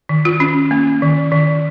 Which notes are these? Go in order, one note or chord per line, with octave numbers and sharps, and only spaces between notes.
D#3
F4
C#4
A#3
D#3
D#3